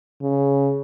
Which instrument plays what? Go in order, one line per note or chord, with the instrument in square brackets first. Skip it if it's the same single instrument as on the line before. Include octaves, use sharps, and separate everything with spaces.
[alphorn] C#3